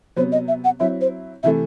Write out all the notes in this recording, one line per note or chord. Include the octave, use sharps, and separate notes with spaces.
C3 F#3 B3 C5
D#5
E5
F#5
F#3 C4 E4 E5
C5
C3 E3 A3 E5